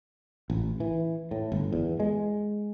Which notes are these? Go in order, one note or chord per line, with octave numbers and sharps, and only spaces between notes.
A1
E3
A2
G1
E2
G#3